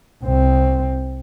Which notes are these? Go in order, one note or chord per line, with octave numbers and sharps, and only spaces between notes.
C2 C4